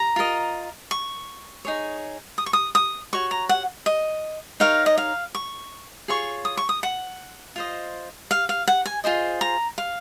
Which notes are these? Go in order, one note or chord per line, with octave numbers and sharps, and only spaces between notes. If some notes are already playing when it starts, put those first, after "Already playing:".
Already playing: A#5
F4 A#4 D#5
C#6
D#4 G#4 C#5
D#6
C#6
D#6
D#6
F#4 C#5 C#6
A#5
F#5
D#5
D#4 A#4 C#5 F5
D#5
F5
C#6
F4 G#4 C#5 C#6
D#6
C#6
D#6
F#5
F4 C5 D#5
F5
F5
F#5
G#5
F4 G#4 C5 D#5
A#5
F5